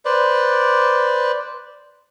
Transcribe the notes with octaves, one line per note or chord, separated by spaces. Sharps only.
B4 C5 D5